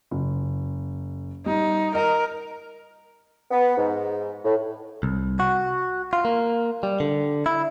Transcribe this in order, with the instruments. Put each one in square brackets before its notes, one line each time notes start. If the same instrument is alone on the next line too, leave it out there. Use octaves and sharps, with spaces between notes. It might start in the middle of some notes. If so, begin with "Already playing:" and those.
[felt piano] F#1
[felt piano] G3 [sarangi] D#4
[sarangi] A#4 [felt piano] D#5
[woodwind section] B3
G#2
A2
[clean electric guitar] C2
F#4
F4
A#3
G3
D3
E4